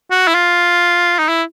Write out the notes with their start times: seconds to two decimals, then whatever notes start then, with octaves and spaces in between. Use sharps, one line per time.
0.11 F#4
0.28 E4
0.35 F4
1.19 D#4
1.29 E4